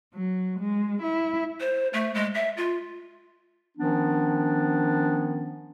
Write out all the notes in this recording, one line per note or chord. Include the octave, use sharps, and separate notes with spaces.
F#3
G#3
E4
C5
A3
G#3
E5
F4
D#3 F3 B3 C#4 D4